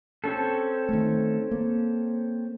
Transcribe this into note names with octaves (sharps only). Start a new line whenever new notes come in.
C4 C#4 A4
D#3 A3
A#3